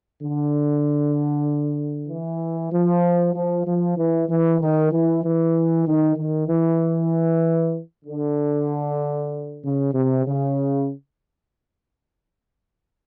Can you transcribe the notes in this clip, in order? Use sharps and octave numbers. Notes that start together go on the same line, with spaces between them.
D3
E3
F3
F3
F3
E3
E3
D#3
E3
E3
D#3
D#3
E3
D3
C#3
C3
C#3